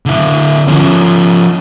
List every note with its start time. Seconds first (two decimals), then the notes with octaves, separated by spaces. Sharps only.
0.06 D3 E4
0.68 F3 C#4